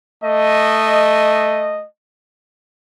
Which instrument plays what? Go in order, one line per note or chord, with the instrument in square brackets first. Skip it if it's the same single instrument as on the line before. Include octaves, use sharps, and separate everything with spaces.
[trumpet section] A3 D#5